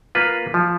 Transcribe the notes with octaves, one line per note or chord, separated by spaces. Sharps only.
A#3 F4 B4
F3